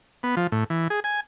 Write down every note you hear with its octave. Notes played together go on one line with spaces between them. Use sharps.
B3
F3
A2
E3
G#4
G#5